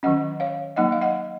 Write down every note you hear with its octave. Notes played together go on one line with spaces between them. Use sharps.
D#3 F#3 C#4 D#5 F#5
C#5 F5
F#3 A#3 D#4 D#5 F#5
F5
D#5 F#5